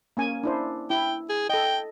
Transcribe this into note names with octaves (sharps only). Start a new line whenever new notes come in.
A#3 C#4 G#5
D4 E4 C5
E4 G5
G#4
A4 D#5 G5